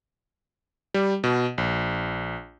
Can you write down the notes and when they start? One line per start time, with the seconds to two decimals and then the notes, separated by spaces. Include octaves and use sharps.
0.94 G3
1.24 B2
1.58 A#1